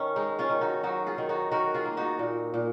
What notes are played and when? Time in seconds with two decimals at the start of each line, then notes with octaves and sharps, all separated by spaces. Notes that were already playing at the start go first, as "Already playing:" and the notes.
Already playing: D#3 C#4
0.16 G#3 D#4
0.39 C#4 F4
0.50 D#3
0.61 D#4 F#4
0.83 F#3 D#4 F#4
1.06 F4 G#4
1.18 D#3
1.29 D#4 F#4
1.51 D#3 F#4 A#4
1.74 F4 G#4
1.85 A#3
1.97 D#4 F#4
2.19 A#2
2.54 A#2